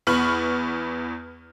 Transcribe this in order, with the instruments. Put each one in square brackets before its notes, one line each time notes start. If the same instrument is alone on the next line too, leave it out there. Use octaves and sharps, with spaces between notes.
[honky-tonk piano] E2 B3 B5 C#6 F6 F#7